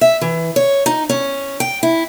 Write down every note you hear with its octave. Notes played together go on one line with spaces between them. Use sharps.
E5
E3
C#5
D#4
C#4
G5
E4